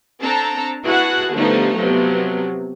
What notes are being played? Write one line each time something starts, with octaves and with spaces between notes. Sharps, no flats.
C4 D4 A4 A5 A#5
E4 F#4 G#4 B4 F#5 A5
D3 F3 G3 A3 B3 D#4
C3 F3 F#3 B3